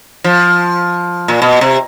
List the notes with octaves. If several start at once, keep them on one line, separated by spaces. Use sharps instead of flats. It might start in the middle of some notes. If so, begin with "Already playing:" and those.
F3
A#2
B2
C3